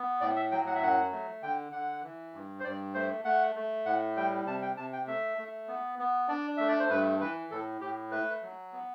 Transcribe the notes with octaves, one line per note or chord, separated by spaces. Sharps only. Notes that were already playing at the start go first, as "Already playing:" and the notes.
Already playing: B3
A2 D5
E5
F#3 G5
F#5
E5
F#2 F#5
A3
D3 G5
D3 F#5
E3
G2
C5
G2 D5
A3 C5
A3 F#5
A3
A2 F#5
G3 G5
C3 A5
G5
C3 A5
G5
A3 E5
A3
B3
B3
D4 D5
A3 E5
D5
C5
G2 B4
E3 B4
A2 A4
A2 G4
A3 B4
F#3
B3